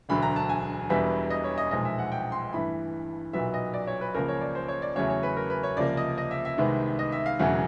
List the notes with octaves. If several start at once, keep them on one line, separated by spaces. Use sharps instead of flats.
E1 D2 D3 F#3 B5
A#5
A5
G#5
E1 E2 B2 G3 B3 E5
D#5
C#5
D#5
B1 A#2 F3 G#3 D#5
E5
F#5
G5
C6
G2 E3 A3 B5
B1 A#2 F#3 B3 E5
D#5
D5
C#5
B4
C#2 C#3 F3 A#3 A#4
C#5
D5
C5
C#5
D5
E2 C#3 F#3 A3 C#5
C#5
B4
A#4
B4
C#5
C#2 C3 F3 A#3 D5
D#5
D#5
E5
E5
C2 C3 D#3 G#3 B3
D#5
E5
F5
E1 E2 C#3 F#3 A3 F#5